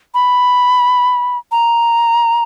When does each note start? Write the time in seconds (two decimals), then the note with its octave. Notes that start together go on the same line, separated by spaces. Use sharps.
0.14 B5
1.52 A#5